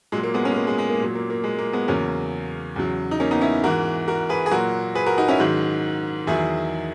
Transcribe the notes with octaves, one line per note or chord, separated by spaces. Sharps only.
A#2 F#3 G#3
A#3
G#3 B3
A#3 C#4
G#3
A#3
G#3
G#3
A#3
A#2 F#3
A#3
A#3
G#3
A#3
G#3 B3
E2 C#3 F#3 A#3 C#4
E2 C#3 F#3
D#4
A#3 C#4
B3 D#4
C#4 E4
G#2 E3 F#4 A#4
F#4 A#4
G#4 B4
G#4
A#2 F#3 F#4 A#4
G#4 B4
F#4 A#4
D#4 F#4
C#4 E4
G#2 D#3 F#3
E2 D#3 F#3 E4 G#4